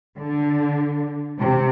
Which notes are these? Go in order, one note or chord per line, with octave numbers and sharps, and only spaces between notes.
D3
C3